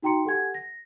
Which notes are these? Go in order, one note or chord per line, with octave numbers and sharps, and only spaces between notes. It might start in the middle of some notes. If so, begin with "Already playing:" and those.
D#4 F#4 G5 A#5 C6 C#7
G4 A4 F#5 G#5 G#6
A#6